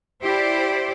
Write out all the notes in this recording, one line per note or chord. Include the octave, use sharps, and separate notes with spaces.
E4 G4 C5 D5